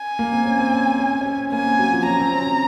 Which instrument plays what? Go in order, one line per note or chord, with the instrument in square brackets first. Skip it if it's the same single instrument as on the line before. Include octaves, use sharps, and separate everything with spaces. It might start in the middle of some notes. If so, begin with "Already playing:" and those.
Already playing: [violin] G#5
[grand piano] A#3
C4
C#4
C4
C#4
C#4
C4
[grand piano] A#3 [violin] G#5
[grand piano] C4
F#3
F3
[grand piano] C#4 [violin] A#5
[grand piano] C4
C4